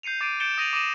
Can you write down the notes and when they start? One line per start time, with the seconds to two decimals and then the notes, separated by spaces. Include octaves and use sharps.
0.03 G6 C7 C#7 D#7 F7
0.21 D6 A6 C7 D7 D#7
0.40 G6 A6 C#7 D7 E7 G7
0.58 D#6 A#6 D#7 F7 F#7
0.73 D6 D#6 A#6 D#7 E7 F#7